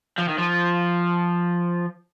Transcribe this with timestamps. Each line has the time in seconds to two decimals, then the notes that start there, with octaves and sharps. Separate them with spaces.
0.18 F3
0.29 D#3
0.38 F3